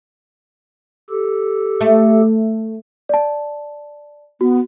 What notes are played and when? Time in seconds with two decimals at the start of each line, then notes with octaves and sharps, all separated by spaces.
1.10 G4 A4
1.81 A3
3.09 D5 A5
4.41 B3 F#4